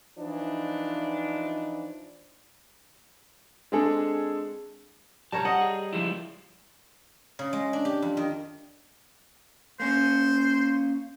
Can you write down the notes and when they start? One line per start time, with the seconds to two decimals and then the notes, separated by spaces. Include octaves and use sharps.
0.17 E3 F3 D4 D#4
3.72 G#3 C4 D4 G#4 A4
5.32 C2 G3 A#4 C#5 A5
5.45 D#5 F#5
5.61 G#4
5.93 F3 G#3 E4
7.39 C#3
7.53 G#3
7.73 D4
7.85 G4
8.02 F2
8.17 D#3
9.80 A#3 C#4 C5